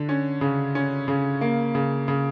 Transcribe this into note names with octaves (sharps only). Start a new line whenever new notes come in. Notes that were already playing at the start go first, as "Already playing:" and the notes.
Already playing: D3
C#4
C#3
C#4
C#3
A#3
C#3
C#3